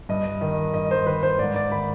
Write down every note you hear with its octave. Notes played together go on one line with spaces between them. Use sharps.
G2 D#5
D#3 D#5
G2 D#5
C5
D#3 B4
C5
G#2 D5
D5
D#3 B5